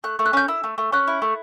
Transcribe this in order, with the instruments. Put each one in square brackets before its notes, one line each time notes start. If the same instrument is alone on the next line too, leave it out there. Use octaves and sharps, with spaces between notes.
[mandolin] A3 F#6
A3
F#6
C#4 G6
E4 E6
A3
A3
C#4 F#6
E4
A3